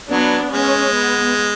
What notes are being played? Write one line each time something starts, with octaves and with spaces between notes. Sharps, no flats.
F#3 B3 D4
G#3 C#4
B3